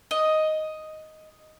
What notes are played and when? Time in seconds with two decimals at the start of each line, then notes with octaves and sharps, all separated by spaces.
0.11 D#5